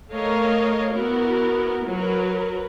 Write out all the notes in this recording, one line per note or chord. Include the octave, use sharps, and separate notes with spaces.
A3 A#4 C#5 D#5 F5
B3 E4 F#4 A#4
F#3 A#4 B4